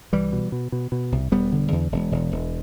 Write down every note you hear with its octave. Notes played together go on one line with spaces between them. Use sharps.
C2 E3 G3
B2
B2
B2
B2
C2
E1 G3 B3
D3
E2
E1
E1
E1